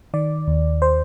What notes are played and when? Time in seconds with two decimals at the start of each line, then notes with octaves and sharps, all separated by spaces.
0.14 D#3 D5
0.47 D#2
0.82 C5